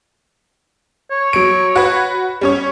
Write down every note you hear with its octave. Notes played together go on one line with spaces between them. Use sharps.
C#5
F#3 D7
F#4 B4
G3 C#4 C#5